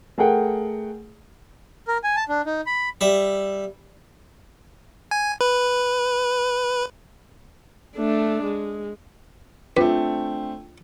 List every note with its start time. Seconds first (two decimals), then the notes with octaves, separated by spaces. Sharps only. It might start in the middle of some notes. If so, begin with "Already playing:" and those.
0.18 A3 G#4 A#4 F#5 G5
1.88 A#4
2.04 G#5
2.16 A5
2.29 D4
2.46 D#4
2.67 B5
3.01 G3 E5
5.11 G#5
5.41 B4
7.97 A3 D4
8.44 G#3
9.77 A3 C4 D4 F4 B4 G5